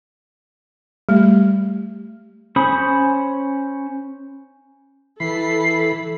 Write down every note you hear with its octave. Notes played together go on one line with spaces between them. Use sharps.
G3 A3
C#4 C5 B5 D#6
E3 A4 B5 C7